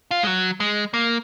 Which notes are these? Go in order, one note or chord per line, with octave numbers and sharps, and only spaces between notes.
F4
G#3
F#3
G#3
A#3